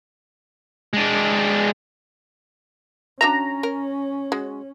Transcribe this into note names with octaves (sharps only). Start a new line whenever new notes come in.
G#3 D4
C#4 D4 F#4 E5 A#5
A#4
G#3 F#4